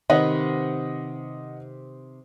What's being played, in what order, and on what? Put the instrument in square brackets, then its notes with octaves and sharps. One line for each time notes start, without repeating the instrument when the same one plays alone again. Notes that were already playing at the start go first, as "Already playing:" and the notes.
[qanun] C3 D#3 B4 [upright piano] D#5 F#5